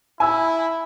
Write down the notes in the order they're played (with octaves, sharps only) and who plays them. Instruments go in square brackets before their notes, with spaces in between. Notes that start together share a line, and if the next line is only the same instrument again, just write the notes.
[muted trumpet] E4 [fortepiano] G#5 E6